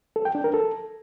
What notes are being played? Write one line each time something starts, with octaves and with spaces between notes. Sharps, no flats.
A4
G5
D4
A#4
A4